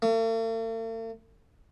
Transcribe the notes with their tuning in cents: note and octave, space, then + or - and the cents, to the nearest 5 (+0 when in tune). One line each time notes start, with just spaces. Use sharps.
A3 +45